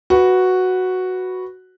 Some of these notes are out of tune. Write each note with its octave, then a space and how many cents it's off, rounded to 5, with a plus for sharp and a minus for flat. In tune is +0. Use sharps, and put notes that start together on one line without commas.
F#4 +0 B4 +0